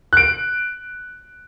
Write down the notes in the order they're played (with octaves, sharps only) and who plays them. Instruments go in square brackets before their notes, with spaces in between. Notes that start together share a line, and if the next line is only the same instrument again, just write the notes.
[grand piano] F#6 D7